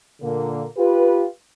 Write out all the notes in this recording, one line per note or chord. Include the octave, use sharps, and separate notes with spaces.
A#2 D3 A#3
F4 G4 B4